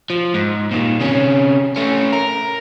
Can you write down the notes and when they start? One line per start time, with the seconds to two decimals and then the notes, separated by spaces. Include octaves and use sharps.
0.10 F3
0.34 G#2
0.71 A#2 D#3
1.00 C3 C#4
1.76 A3 C#4
2.13 A#4